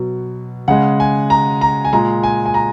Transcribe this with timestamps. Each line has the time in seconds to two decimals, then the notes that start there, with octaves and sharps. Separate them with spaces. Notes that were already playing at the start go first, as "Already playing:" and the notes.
Already playing: B2 F#3
0.68 C#3 G#3 F#5
1.00 G#5
1.30 A#5
1.61 A#5
1.85 G#5
1.93 A#2 G#3 A#5
2.23 G#5
2.46 G#5
2.54 A#5